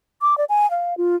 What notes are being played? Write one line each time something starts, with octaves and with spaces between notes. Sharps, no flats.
D6
D5
G#5
F5
F4